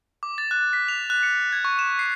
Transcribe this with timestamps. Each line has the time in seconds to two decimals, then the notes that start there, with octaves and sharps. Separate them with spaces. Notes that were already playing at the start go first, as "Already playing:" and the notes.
0.23 D6
0.38 A6
0.51 F#6
0.73 B6
0.88 F7
1.10 F#6
1.23 C#7
1.52 G#6
1.65 C#6
1.79 E7
1.99 C7